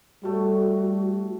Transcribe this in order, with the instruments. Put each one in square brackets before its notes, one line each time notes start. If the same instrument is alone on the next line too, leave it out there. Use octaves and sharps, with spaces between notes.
[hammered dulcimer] A2 A3 [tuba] G3 [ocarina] F#4